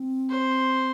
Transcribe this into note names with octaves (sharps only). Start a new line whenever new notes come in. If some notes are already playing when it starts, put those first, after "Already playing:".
Already playing: C4
C5